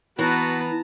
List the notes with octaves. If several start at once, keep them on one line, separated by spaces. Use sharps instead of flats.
E3 B3 F#4 B4 A5 A#5